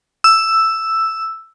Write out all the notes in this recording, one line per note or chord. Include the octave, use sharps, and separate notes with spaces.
E6